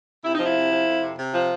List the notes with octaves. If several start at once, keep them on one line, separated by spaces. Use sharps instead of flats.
C3 E4
D#4
F3 E4
C3
F3
F2
C3
C3
F3